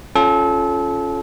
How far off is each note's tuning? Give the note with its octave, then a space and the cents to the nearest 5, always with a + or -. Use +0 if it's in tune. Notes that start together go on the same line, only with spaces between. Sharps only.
C#4 +0 F4 +0 A4 -30